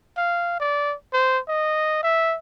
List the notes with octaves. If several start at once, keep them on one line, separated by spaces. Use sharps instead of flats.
F5
D5
C5
D#5
E5